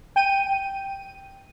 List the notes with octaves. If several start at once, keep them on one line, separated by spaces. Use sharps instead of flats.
G5 D#7